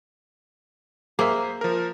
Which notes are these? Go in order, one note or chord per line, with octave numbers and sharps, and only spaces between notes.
A#3 G#4 C5 E5
F3 A#4